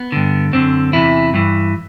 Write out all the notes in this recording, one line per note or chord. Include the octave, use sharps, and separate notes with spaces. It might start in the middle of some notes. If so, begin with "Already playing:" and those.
Already playing: B3
G2 D3
F#2 D3 C4
E2 C3 E3 E4
G2 E3